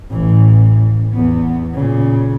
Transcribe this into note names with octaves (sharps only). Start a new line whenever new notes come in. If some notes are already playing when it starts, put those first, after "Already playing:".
A1 E3
E2 B3
A#2 C#3